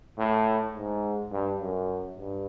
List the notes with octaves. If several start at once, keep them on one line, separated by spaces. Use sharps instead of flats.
A2
G#2
G2
F#2
G2